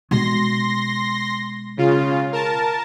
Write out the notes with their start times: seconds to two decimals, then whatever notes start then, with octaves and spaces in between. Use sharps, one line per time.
0.11 B2 G#3 C6 A#6
1.77 C#3 F4
2.32 A#4 A5